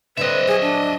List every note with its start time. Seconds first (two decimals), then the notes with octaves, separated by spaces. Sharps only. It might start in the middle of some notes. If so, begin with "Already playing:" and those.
0.17 D3 G3 C4 B4 D#5 E5
0.47 F#3 G4 G#4
0.61 D4